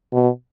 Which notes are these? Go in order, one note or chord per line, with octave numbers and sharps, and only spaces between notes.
B2